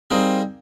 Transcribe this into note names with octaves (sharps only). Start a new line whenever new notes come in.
G3 A#3 C4 D#4 G#4